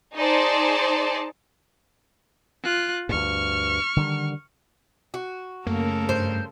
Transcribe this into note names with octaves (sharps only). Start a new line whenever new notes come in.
D#4 G#4 C5 D5 A5
F4 F#6
D2 G2 C#6 F6
D3 D#3 G3
F#4
F#2 C#3 A3 A#3 A4 A#4
G2 C5